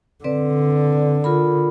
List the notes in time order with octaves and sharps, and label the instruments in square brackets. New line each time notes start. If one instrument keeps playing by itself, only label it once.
[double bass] D3 [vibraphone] C4 B4 D5
[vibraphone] F4 A#4 B5